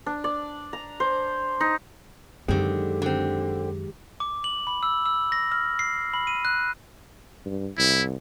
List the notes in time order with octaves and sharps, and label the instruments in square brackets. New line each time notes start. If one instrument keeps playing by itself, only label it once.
[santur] D4
D5
A#5
C5
D#4
[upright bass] F#2 [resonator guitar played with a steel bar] D3 C4 [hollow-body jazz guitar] D#3 G#3 [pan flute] G4
[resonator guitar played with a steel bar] D3 C4
[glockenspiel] D6
F#7
B5
E6
E6
A#6
F6
C7
B5
D#7
F#6
[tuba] G2
[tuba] C2 [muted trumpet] E4